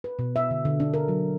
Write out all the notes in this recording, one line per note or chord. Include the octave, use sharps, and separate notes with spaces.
B4
B2
E5
D3
D3
D4
A#4
F#3